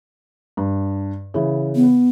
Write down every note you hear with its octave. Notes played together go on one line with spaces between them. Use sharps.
G2
C#3 E3
B3